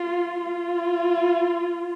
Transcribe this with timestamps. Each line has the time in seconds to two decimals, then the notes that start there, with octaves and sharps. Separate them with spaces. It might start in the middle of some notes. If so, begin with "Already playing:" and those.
Already playing: F4
0.45 F4